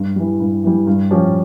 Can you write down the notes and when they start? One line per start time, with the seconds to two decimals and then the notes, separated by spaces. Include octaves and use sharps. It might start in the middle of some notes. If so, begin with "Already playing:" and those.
Already playing: G2
0.16 E3 G3
0.40 G2
0.64 E3 G3
0.87 G2
1.11 F3 C#4 G4